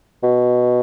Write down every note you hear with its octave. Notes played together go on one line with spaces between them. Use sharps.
B2